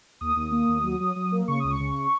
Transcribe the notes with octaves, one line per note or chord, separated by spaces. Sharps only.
D#2 D#6
D#2
A#3
D#2
F#3
F#3
F#3
A#3
C#3 C#6
C#2 D#6
C#6
C#3